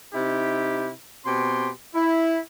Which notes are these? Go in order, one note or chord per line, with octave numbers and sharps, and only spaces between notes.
C3 D#4 E4 G4
B2 C4 G4 C6
E4